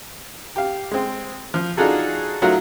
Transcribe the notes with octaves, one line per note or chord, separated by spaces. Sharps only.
G4 F5
G#3 C4
F3
D4 D#4 F4 F#4 G#4 A4
F#3 A3 D#4 F4 F#4 A#4